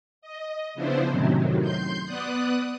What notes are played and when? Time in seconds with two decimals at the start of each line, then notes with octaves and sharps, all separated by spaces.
0.22 D#5
0.75 C#3 F3 B3 D4 E4 C5
1.09 F#2 A2 C3 D#3 F#3
1.61 C6 G6
2.05 B3 D5 D#6 F#6